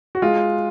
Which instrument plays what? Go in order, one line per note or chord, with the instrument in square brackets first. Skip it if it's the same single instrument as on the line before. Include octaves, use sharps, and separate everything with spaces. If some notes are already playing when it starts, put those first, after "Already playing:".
[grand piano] F#4
G#3 F4